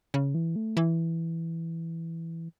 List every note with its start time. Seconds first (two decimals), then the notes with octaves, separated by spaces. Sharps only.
0.14 C#3
0.34 E3
0.56 A3
0.77 E3